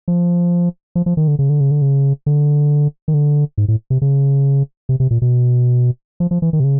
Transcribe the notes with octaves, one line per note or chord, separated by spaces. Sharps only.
F3
F3
F3
D#3
D3
C#3
D3
C#3
D3
C#3
D3
D#3
D3
G#2
A2
C3
C#3
C3
C3
A#2
B2
F3
F3
E3
D#3
C3
C#3